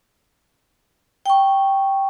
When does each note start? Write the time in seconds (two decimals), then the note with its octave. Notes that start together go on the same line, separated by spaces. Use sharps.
1.26 G5 C#6